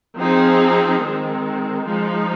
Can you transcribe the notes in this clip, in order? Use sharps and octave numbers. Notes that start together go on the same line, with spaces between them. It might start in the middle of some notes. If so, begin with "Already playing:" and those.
F3 C4 D#4 G#4
D#3 G#3 C4
F3 G#3 D#4